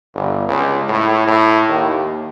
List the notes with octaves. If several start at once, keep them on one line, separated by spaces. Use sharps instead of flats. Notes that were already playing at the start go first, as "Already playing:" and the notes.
G1
C#2
A2
A2
D#2